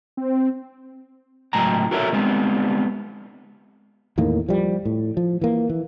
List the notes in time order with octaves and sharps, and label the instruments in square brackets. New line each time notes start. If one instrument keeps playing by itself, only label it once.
[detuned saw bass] C4
[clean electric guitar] C#2 A2 F#3 G5 A#5
F#4 A4 A#4 C#5 E5
G3 G#3 B3 C4
[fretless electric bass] E2 A2 D#3 A#3
F3 G3
A2
F3
E3 A#3
E3